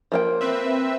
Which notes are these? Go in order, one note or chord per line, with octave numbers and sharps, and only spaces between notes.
F3 A#3 G5
C4 B4 E5